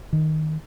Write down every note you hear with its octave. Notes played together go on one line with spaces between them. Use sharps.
D#3